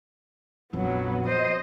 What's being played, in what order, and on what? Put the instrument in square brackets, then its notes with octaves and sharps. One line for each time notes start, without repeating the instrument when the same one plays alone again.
[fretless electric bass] A#1 F2 [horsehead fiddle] F#3 B3
[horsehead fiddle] C5 D#5